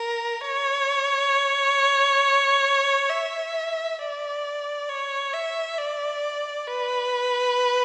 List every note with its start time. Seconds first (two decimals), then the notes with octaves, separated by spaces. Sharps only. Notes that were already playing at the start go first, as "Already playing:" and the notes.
Already playing: A#4
0.41 C#5
3.10 E5
3.99 D5
4.89 C#5
5.33 E5
5.78 D5
6.67 B4